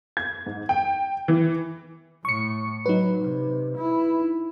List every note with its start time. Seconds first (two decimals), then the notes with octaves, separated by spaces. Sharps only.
0.17 G#6
0.46 G#2
0.69 G5
1.28 E3
2.25 A2 C#6 C#7
2.86 F#3 D#4 B4
3.23 C3
3.77 E4